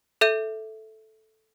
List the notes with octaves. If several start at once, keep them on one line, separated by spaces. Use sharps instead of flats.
A4 E5 G6 D#7